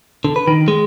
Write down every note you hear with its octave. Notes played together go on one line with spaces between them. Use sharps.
D3
B4
D#3
G#3